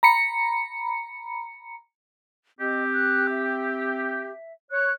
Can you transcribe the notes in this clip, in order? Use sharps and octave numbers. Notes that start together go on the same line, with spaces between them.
A#5 B5 C#7
C4 G4 D#5
F#6
E5
C#5 F#6